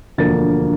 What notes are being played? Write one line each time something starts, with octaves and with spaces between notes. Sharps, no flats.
E1 D2 D3 F3 A#3 A6